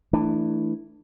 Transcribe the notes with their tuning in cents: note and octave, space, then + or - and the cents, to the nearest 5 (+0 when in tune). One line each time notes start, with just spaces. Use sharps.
E3 +0 A3 +15 D4 +25